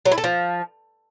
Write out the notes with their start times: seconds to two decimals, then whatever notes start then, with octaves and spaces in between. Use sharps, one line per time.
0.05 F#3
0.12 E4
0.18 A4
0.24 F3